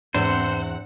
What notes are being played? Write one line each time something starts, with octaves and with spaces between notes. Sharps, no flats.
E2 G#2 C4 D4 C5 F#5 E7